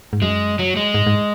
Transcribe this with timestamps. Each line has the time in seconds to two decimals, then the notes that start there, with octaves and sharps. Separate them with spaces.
0.13 G#2
0.22 F#2 G#3
0.59 F#3
0.76 G#3
0.94 G#2
1.07 G#2